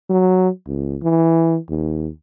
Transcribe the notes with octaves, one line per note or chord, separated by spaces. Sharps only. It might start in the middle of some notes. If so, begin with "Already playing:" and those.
F#3
C#2
E3
D#2